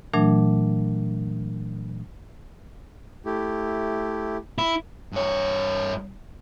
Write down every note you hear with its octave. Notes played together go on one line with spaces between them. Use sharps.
A#2 E3 F#3 A3 D4
A3 E4 G4
E4
G2 C#5